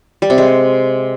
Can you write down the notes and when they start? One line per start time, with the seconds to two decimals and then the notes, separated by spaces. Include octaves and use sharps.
0.22 G3
0.30 C3
0.38 G#3